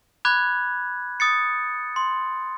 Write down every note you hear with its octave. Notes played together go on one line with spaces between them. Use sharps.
B5 D6 F#6 G#6
D#6 A6 C#7
C6